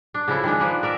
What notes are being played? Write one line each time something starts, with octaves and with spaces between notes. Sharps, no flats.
D4
C#3 F3 E4 A4
D#3 G#3 D4
F3 A#3 B4
A#4 D5 E5